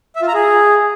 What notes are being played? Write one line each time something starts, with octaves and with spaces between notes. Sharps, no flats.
E5
F4
A#5
G#4